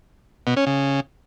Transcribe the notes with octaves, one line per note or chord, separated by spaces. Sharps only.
B2
C#4
C#3